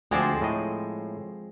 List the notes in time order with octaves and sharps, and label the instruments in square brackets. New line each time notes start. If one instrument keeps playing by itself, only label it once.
[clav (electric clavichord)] D2 D5 [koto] F3 G#3 C4
[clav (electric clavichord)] A2 D#5